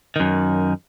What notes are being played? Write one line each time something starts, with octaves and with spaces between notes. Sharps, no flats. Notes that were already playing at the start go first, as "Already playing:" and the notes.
F#2 D#3